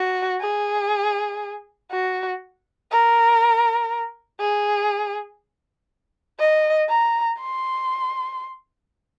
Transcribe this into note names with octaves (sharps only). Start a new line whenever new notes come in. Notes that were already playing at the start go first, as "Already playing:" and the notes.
Already playing: F#4
G#4
F#4
A#4
G#4
D#5
A#5
C6